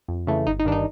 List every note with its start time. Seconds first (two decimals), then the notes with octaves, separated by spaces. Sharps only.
0.08 F2
0.27 C#3 E3 A3
0.47 G1 D#4
0.59 D#4
0.65 G2 D#3 D4
0.72 D#4